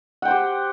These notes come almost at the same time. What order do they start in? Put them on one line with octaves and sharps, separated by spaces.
F#5 G5 C5 G4